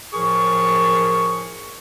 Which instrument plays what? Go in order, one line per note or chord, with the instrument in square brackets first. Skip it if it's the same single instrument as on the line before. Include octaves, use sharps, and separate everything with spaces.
[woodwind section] A2 F3 G#4 A#4 C#6